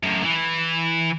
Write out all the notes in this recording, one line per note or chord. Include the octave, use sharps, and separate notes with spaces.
F#2 A2
E3